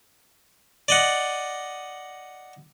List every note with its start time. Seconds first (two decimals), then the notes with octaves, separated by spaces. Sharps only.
0.88 D5 D#5 F#5